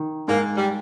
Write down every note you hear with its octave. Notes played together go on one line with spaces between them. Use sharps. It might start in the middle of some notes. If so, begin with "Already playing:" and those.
Already playing: D#3
G#2 A#3
G3